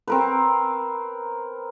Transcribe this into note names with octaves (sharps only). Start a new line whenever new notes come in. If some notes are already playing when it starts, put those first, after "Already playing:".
C4 A#4 B4